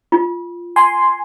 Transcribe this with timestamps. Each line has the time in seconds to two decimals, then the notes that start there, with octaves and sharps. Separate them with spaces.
0.12 F4
0.76 G#5 C6